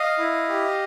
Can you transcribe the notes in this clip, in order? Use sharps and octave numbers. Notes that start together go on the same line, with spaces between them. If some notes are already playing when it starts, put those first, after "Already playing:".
Already playing: D#5 F5
E4
G4